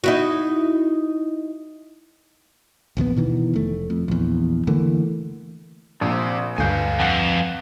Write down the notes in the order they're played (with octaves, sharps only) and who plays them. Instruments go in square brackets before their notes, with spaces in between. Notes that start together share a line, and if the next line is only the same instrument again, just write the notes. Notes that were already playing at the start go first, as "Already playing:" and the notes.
[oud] D#4 E4 F#4
[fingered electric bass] A#1 D#2 D#3 B3
B2 D#3 E3
F1 A3
F2
A#1 E2
D3 E3 A3 A#3
[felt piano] A#1 [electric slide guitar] C3 C4
[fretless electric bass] D2 G2 [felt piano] A3 G6 [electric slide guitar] B4 F5 G#5
[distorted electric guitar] F2 [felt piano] F#5